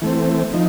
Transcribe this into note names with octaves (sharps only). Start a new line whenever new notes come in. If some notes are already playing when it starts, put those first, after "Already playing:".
E3 A3 C4
F3 D#4